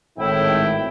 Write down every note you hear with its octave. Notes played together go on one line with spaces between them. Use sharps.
G#1 A2 E4 G5